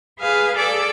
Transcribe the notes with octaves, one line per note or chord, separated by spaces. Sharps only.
G#4 B4 F5
G#4 A4 D5 D6 E6